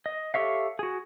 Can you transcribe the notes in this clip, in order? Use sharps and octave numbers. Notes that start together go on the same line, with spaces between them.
D#5
G4 A4 C#5 E5 F5
F#4 G#4